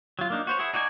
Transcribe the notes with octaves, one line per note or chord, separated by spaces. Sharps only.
F#3 F4
A#3 D4 D#4
F#4 C5 C#5
E4 G#4 F#5
D#4 F#4 D5 G5 G#5